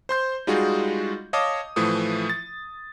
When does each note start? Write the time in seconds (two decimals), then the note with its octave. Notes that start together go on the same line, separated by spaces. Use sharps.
0.09 C5 C6 G6
0.47 G3 G#3 D#4 F4 F#4 G#4
1.33 C#5 D#5 F5 A5 D6 D#6
1.76 A2 E3 F3 A3 D#6
2.30 A6